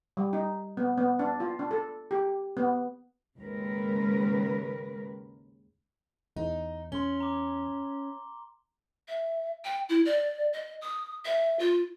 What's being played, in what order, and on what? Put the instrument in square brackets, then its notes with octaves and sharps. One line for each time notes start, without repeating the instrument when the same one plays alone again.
[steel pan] G3
D#4
B3
B3
D4
F4
D4
A4
G4
B3
[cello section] D#2 G#2 C#3 G#3 A#4 B4
[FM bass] E2 [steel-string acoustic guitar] D#4
[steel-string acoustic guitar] C#4 [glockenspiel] C6 G7
[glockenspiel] A#5 D6
[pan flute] E5
G5
E4
D5
D#5
D#6
E5
F4